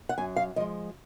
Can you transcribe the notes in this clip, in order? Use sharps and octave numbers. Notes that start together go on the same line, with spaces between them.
F#5
F#2 G#5
F5
F3 G#3 D#5